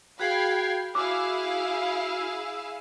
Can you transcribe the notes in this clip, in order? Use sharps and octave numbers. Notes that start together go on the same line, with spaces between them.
F#4 G#4 F5 G5 B5 G6 G#6 C7
E4 F#4 G#4 F5 D6 E6